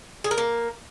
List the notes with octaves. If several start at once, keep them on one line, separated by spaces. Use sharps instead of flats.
G#4
A#4
A#3